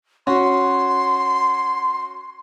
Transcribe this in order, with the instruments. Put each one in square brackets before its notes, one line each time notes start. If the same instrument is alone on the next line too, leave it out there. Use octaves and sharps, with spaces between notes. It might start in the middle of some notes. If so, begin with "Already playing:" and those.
[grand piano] C#4 F#4 [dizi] C6